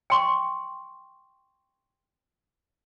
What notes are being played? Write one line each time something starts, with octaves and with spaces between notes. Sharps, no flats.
G5 C6 C#6